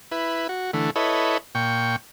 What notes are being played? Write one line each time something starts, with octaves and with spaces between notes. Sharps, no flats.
E4 B4
F#4
D3 E3 A3
E4 A4 B4 C#5 D#5
A#2 G5 C#6